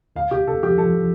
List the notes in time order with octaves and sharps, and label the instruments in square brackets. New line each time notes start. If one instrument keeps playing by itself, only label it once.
[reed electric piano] D2 [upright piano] F5
[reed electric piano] C3 [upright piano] G4
[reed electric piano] C3 [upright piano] A4
[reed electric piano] F3 [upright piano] G4
[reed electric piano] F3 [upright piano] A4
[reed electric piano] F3